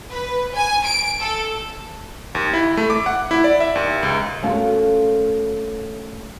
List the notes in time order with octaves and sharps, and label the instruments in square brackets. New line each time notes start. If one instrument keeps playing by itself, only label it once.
[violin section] B4
G#5
D7
A4
[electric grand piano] D#2
E4
A3
D6
F#5
E4
D5
E5
D#2
C#2
[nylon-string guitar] A3 A#3 C#4 F4 F#4 A4